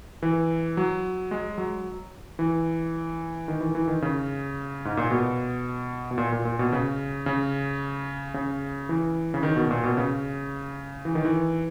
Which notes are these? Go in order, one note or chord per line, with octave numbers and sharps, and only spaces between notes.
E3
F#3
G#3
F#3
E3
D#3
E3
E3
D#3
C#3
G#2
A#2
B2
B2
A#2
A#2
A#2
B2
C#3
C#3
C#3
E3
C#3
D#3
B2
A#2
B2
C#3
E3
D#3
E3